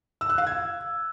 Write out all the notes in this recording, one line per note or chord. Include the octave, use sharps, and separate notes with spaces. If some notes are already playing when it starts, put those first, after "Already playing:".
E6
F#6
F5
G#6